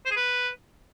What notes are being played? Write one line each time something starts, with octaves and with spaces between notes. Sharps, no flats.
C5
G#4
B4